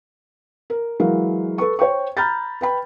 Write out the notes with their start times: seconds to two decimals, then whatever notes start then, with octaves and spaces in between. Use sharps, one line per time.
0.70 A#4
1.00 E3 F#3 G#3 A#4 F5
1.58 A4 B4 C#6
1.79 C5 C#5 G5 C#6
2.17 A#5 B5 F6 G6 A6
2.61 B4 G5 B5